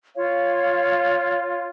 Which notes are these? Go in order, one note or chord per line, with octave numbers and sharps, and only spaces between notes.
F4 C#5 F5